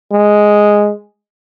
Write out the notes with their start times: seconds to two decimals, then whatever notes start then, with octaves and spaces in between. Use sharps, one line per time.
0.13 G#3